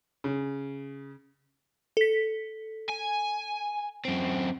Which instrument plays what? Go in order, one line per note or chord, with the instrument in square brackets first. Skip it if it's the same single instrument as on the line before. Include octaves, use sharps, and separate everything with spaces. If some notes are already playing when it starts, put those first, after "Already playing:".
[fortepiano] C#3
[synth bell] A4 B6
[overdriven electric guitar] G#5
F#2 C4